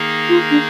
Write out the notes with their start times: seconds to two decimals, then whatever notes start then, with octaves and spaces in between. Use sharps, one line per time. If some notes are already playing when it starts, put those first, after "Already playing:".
Already playing: D#3 A#3 D#4 G#4
0.29 F4
0.51 D4